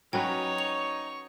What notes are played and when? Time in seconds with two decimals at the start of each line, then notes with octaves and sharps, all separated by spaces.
0.13 F#3 C#4 D#4 B4 C#5 G5
0.58 C#6 F7